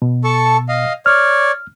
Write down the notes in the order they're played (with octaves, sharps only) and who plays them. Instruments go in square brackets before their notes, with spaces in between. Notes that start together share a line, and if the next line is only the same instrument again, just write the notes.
[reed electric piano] B2
[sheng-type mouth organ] A4 A5 C#6
D#5 F5
[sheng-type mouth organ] C#5 D5 [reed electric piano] F6